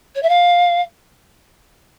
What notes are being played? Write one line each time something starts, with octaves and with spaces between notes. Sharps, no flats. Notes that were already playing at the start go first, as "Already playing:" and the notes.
C#5
E5
F5